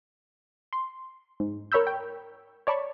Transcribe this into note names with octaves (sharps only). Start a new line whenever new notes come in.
C6
G#2
A#4 C#5 B5 E6 G6
G5
C#5 D5 A5 B5 C#6